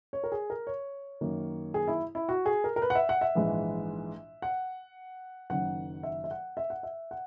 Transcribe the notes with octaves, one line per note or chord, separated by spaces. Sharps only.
C#5
A#4
G#4
A#4
C#5
F#2 D#3 A#3
G#4
E4
E4
F#4
G#4
A#4
A#4
B4
F#5
E5
F#5
E5
A#1 G#2 E3 G#3
F#5
F#1 F#2 D#3 F#5
E5
E5
F#5
E5
F#5
E5
F#5